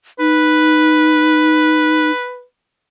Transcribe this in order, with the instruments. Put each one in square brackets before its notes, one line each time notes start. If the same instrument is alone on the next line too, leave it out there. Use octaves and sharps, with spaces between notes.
[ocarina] D#4 [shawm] B4